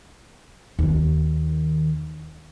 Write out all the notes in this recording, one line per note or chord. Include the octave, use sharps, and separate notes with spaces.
D#2 D#3